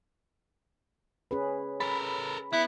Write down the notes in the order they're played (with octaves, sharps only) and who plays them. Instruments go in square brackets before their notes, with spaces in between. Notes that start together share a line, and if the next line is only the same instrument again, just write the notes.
[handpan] C#4 G#4 B4
[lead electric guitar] A4 A#4 [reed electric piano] B5
[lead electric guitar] B3 [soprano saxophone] E4